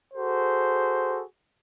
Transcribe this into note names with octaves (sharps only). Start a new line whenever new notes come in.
F#4 G#4 A4 C5